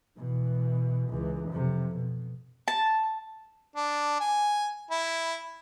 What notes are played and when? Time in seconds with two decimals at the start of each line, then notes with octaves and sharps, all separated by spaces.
0.18 B2 E3
1.09 C#2 E3
1.49 F2 C3
1.96 B2
2.68 A5
3.76 D4
4.20 G#5
4.91 E4